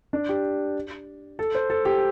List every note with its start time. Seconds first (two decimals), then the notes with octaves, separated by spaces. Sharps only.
0.13 D4
0.29 G4
1.39 A4
1.55 C5
1.70 A4
1.85 G4